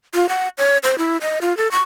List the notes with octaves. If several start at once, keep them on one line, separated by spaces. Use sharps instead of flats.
F4
F#5
C#5
C5
E4
D#5
F4
A4
C#6